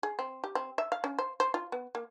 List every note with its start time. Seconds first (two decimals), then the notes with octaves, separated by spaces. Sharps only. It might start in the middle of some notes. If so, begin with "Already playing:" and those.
0.03 G#4
0.19 C4
0.44 G4
0.55 C4
0.78 E5
0.92 F5
1.04 C#4
1.19 C5
1.40 C5
1.54 F4
1.72 B3
1.95 A#3